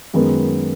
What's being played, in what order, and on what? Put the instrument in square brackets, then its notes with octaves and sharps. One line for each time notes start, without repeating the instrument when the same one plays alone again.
[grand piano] F#2 D#3 G#3 B3